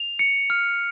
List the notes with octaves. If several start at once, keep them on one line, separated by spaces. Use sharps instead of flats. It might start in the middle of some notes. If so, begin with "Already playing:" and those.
Already playing: F7
C#7
F6